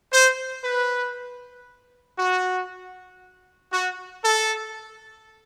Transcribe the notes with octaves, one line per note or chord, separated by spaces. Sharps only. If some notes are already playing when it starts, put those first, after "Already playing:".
C5
B4
F#4
F#4
A4